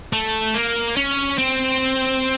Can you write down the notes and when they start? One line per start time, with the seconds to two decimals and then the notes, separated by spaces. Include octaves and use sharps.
0.13 A3
0.55 A#3
0.97 C#4
1.38 C4